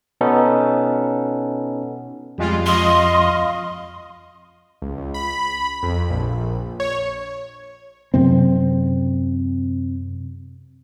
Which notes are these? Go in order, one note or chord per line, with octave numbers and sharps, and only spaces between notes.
B2 B3 C#4 D#4 A4
F2 G3 G#3 F4
D#5 F5 C6
C#2
C#2
B5
F2
A#1
C#5
F#2 C3 C4